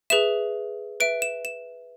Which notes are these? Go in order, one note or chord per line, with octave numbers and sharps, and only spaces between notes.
G#4 B4 E5 E7
B4 E5 D7
E7
E7